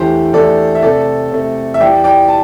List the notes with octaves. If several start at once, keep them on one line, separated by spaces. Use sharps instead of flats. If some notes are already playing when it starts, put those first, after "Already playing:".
Already playing: E2 D3 A3 G4 C5
E2 D3 A3 A4 D5
E5
C3 A3 A4 D5
C3 A3
E5
E2 E3 G3 D5 G5
D5 G5
A5